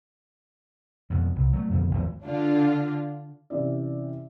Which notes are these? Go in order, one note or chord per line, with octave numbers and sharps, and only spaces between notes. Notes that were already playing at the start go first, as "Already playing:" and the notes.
F2 B2
C2
F#3 A3
F2 B2 D3 F3
G#1 E2 F3
D3 D4 F4
C3 E3 C#4 D5